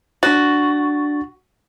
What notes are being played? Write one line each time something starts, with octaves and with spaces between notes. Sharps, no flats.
D4 F#4 A6